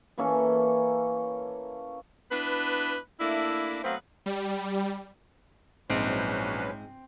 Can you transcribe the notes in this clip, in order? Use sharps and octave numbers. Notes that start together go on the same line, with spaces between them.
E3 A#3 C#4 A4
B3 D4 E4 B4
A3 A#3 D4 E4
F#3 A3 B3 C4 B4 F5
G3
A#1 G#2 F#3 C4 C#4 B4